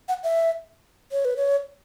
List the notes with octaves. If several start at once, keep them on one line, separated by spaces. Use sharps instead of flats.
F#5
E5
C#5
B4
C#5